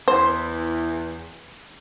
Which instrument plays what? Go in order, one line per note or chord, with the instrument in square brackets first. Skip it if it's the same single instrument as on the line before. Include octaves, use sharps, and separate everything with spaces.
[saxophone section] E2 E3 [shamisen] C5